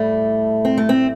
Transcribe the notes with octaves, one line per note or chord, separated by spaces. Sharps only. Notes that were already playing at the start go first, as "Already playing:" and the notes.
Already playing: A2 G3 A3
C4
A3
C4